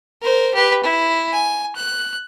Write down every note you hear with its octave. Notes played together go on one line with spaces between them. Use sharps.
A#4 C5
G4 B4
E4
G#5
F#6